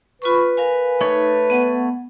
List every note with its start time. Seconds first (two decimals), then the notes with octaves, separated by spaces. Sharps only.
0.22 F4 B4 B5 C#6
0.57 A#4 F5 G#5
1.01 A3 D#4 C#5
1.50 B3 F#5